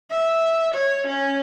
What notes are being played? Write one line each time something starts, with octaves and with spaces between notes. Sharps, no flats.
E5
C#5
C#4